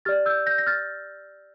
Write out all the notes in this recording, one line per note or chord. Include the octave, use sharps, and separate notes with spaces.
G4 D5 F6 A6
E6 G6
G6 A#6
A#6
F6 A6